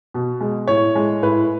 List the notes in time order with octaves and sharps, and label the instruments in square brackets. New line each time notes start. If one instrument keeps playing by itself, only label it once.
[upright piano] B2
G#3
A2 C#5
G#3
A2 B4